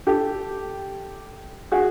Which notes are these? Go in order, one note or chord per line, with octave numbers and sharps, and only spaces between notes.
G4 A4
F#4 G#4